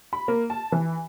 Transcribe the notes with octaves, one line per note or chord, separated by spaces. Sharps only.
B5
A#3
A5
E3